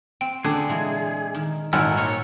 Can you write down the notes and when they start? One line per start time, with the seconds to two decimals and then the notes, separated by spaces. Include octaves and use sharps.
0.21 C4 G5
0.45 D3 D4 G#4
0.68 A#2 E3 G#3
1.34 D#3
1.73 G#1 A#2 E4 F#5 F6
1.97 A#3 C#5